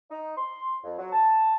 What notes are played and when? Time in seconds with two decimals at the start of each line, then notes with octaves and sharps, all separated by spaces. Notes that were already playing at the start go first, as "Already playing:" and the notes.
0.11 D#4
0.37 C6
0.84 F2
0.98 F#3
1.13 A5